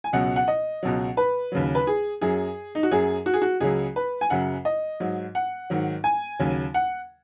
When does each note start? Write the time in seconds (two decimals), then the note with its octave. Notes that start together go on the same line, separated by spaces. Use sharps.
0.04 G#5
0.13 C#2 B2 F#3 F#5
0.36 F#5
0.48 D#5
0.83 C#2 B2 F#3
1.17 B4
1.52 D#2 C#3 F#3
1.75 B4
1.87 G#4
2.21 F#2 F#3 G#4
2.75 D#4
2.83 F#4
2.91 F#2 F#3 G#4
3.26 F#4
3.34 G#4
3.42 F#4
3.60 C#2 C#3 F#3 G#4
3.96 B4
4.21 G#5
4.30 F#2 C#3 F#3 F#5
4.65 D#5
5.00 G#2 F#3
5.35 F#5
5.70 G#2 D#3 F#3
6.04 G#5
6.39 D#2 C#3 F#3
6.74 F#5